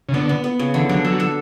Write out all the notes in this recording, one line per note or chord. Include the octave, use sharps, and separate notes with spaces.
C#3
D3 B3
B3
B3
C#3
D3 E3
F#3 D4
F#3 A4
A4